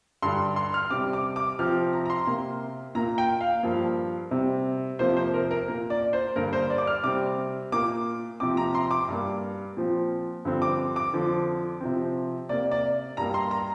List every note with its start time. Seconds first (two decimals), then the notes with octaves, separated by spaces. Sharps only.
0.22 G2 D3 G3 C6
0.56 C6
0.74 F6
0.90 C3 G3 C4 D6
1.13 D6
1.36 D6
1.59 C3 F3 C4 F6
1.93 A#5
2.05 A#5
2.10 C6
2.27 C3 A#3
2.95 A#2 A#3 A#5
3.18 G5
3.41 F5
3.63 G2 F3 A#3
4.31 C3 G3 C4
4.99 F2 C3 F3 A#3 C5
5.17 C5
5.34 A#4
5.51 A#4
5.68 A#2 A#3
5.90 D5
6.13 C5
6.36 G2 D3 A#3 A#4
6.53 C5
6.70 D5
6.78 D6
6.87 F6
7.04 C3 G3 C4 D6
7.72 A#2 A#3 D6
8.40 C3 F3 C4 D6
8.57 A#5
8.75 C6
8.91 D6
9.08 G2 G3 A#3
9.77 A#2 F3 C4
10.45 G2 D3 F3 C4
10.62 D6
10.96 D6
11.13 F2 D3 F3
11.81 C3 F3 C4
12.49 C3 A#3 D5
12.71 D5
13.17 G2 G3 A#3 A#5
13.34 C6
13.51 A#5